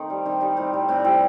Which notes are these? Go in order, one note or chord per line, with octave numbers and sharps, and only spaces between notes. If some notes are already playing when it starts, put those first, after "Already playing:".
Already playing: D#3 A3 C4 D#4
G3
D#3 C4
G3 D#4
A2 C4
G3
A2 C4
G3 E4